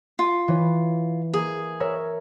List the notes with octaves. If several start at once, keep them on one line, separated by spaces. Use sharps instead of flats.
F4
E3 C#5
A#3 G#4
A#4 C#5 E5